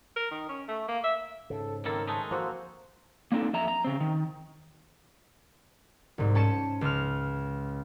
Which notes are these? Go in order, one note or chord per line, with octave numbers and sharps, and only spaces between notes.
A#4
D#3
C#4
A3
A#3
E5
G#2 C#3 A4
D#3 G3 A#3 C4 A4 A#4
G#3 A3 D#4 A5
F3 A#3 F#4 A4 C5
A#3 C4 D4 D#4 A4
F2 E5 A#5
A#5
C#3 C4
D#3
C2 G#2
C#4 A5 C#7 E7
C#2 F6